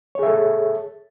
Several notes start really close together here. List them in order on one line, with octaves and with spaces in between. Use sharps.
C#5 G#4 E5 A4